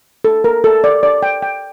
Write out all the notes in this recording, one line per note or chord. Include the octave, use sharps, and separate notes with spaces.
A4
A#4
A4
D5
D5
G5
G5